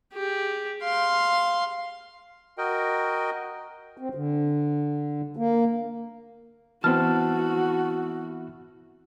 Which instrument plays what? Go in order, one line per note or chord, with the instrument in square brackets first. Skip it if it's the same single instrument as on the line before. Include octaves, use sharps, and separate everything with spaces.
[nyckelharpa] G4 G#4
F5 C6
[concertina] F#4 A#4 D#5 G5
[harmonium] C4
D3
A#3
[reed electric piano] E3 B3 C4 [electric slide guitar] E4 A5 [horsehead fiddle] F#4 [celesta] F6